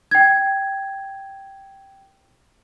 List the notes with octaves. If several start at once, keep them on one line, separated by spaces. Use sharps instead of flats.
G5 G#6